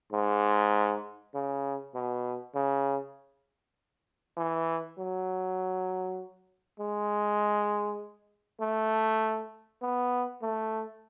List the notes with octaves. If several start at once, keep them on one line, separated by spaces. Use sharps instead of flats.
G#2
C#3
B2
C#3
E3
F#3
G#3
A3
B3
A3